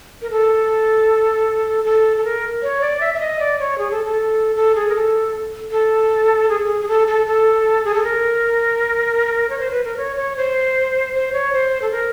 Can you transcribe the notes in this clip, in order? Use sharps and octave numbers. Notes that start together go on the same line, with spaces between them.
A#4
A4
A4
A4
A#4
C#5
D5
E5
E5
D#5
D5
C#5
G#4
A4
A4
A4
G#4
A#4
A4
A4
G#4
G#4
G#4
A4
A4
A4
G#4
A4
A#4
C#5
C5
B4
A#4
C#5
C#5
C5
C5
C#5
C5
A4
A#4